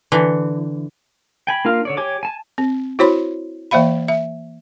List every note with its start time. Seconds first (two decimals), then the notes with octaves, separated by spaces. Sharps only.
0.12 D3 E3
1.47 G5 G#5 B5
1.65 A#3 D4 F4 F5 F6
1.85 D3 C#5 D5
1.97 G4 C#5 G#5 D6
2.23 G#5 A5
2.58 C4
2.99 E4 F#4 C5 C#5 B5 C6
3.71 E3 A#3 C5 E5 F5 B5
4.08 E5